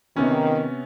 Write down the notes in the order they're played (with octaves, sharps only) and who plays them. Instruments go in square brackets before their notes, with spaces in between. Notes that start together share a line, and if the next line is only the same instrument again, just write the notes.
[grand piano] C3 B3 C#4 [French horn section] D#3